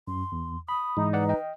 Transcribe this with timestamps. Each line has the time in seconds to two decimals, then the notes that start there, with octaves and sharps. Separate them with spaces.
0.08 F#2 C6
0.32 E2
0.69 B5 D#6
0.97 G#2 E3 G#3 D#4
1.13 B4 D5 F#5
1.29 D#5 G5